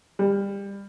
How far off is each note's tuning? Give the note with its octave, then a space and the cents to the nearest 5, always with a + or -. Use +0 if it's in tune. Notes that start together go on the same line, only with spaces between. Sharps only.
G3 +25